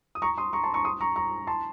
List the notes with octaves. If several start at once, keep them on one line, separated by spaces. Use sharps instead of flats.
D#6
A#5 C#6
C6 D#6
A#5 C#6
A5 C6
A#5 C#6
C6 D#6
A#5 C#6
A#5 C#6
A5 C6